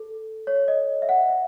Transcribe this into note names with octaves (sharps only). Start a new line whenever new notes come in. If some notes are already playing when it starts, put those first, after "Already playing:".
Already playing: A4
C#5
D#5
E5
F#5
E5